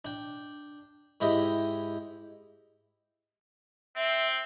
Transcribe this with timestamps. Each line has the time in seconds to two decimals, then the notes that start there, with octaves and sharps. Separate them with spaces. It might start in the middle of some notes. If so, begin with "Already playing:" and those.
0.05 D4 G5
1.21 G#2 E4 G4 D#5 G5
3.96 C4 E5